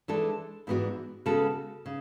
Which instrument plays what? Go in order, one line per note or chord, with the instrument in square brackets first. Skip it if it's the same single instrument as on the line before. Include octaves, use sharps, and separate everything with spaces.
[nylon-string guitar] E3 G#3 D4 A4
G#2 E3 B3 D4 F#4
C#3 G#3 B3 F#4 A4
C#3